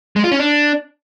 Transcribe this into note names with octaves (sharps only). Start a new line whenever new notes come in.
G#3
F4
C#4
D4